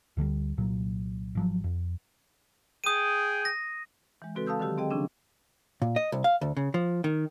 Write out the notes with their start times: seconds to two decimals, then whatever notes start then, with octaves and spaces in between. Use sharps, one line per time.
0.17 D2 D3 F3 G3
0.57 C2 A#2 F#3
1.35 G#1 F3 F#3
1.64 F2
2.84 G#4 G5 D#6 D#7
3.45 A#6
4.22 E3 G#3
4.35 C#3 G#3 C4 F#4 A4 B4
4.47 A4 F5 A5 D#6 E6 G6
4.60 D3 D#3 F#3 G4 E6
4.78 C4 G#4 D#5 G5
4.91 C#3 F3 C#4 D4
5.82 A#2
5.96 D#5
6.12 C2
6.24 F5
6.41 D2
6.57 C#3
6.74 F3
7.04 D#3